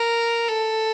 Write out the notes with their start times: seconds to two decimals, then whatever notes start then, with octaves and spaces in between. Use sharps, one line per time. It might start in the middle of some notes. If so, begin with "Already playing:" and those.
Already playing: A#4
0.48 A4